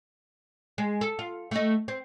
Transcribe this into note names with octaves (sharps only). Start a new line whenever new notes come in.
G#3
A4
F4
A3 D#5
C4